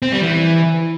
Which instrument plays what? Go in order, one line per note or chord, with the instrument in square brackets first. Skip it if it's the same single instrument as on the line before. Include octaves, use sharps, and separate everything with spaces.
[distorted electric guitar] C4
G3
E3